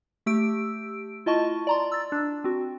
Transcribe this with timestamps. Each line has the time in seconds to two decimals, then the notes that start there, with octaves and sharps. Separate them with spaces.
0.26 A3 G4 E6 D7
1.26 E4 F4 D#5 A5 C#6
1.67 D5 A#5 C6
1.92 E6 A6
2.12 D4
2.44 C4 F#4